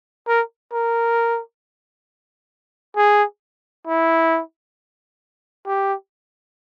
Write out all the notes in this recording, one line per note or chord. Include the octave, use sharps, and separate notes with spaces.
A#4
A#4
G#4
E4
G4